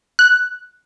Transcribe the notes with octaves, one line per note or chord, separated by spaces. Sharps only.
F#6